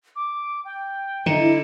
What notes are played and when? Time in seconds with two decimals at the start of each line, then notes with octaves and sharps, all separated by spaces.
0.16 D6
0.65 G5
1.26 D3 D#4 E4